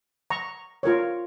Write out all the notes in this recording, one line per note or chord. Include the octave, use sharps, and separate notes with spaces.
A#5 C#6
F4 A#4 C#5